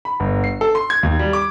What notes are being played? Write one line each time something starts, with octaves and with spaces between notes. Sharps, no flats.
B5
G1
C7
A4
C6
G#6
D#2
G3
D6